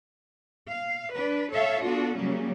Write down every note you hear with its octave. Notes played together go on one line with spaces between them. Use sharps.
F5
D4 B4
A4 C#5 E5 F5
B3 D4 F4 F#4 A4
C#3 F#3 G3 A#3 C#4